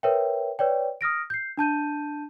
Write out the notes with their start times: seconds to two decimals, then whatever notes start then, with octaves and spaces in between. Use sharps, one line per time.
0.03 A#4 B4 C#5 E5 G5
0.59 B4 C#5 D5 G5
1.01 D#6 F6 A#6 D7
1.30 G6 C7
1.57 D4 A5 G6 D#7